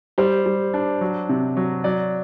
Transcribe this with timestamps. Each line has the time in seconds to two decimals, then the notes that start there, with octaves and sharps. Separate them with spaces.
0.18 G3 C5
0.46 G3
0.74 D4
1.01 F#3
1.29 C3
1.57 F#3
1.84 F#3 D5